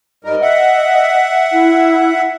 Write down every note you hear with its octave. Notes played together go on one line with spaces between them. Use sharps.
G#2 G3 A#4 D#5
E5 F#5
E4